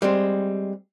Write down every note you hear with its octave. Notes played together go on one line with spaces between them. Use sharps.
G3 G#3 C4